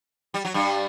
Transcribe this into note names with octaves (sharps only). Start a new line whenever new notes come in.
G3
F#3
G2 G3